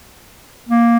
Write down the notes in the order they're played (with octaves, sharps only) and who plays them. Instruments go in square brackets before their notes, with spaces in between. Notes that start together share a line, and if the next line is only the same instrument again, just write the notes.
[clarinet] A#3